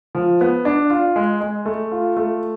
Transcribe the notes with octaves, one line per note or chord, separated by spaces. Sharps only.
F3
B3
D4
F4
G#3
G#3
A3
F4
A3